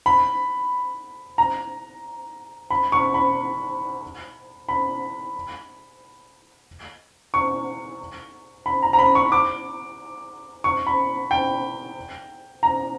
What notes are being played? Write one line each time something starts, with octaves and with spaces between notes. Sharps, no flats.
B5
A#5
B5
C#6
B5
B5
C#6
B5
A#5
A#5
B5
C#6
D6
C#6
B5
G5
A#5